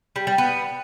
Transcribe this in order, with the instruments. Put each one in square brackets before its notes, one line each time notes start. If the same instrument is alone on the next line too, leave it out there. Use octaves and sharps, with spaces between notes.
[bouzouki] G3
G3
B3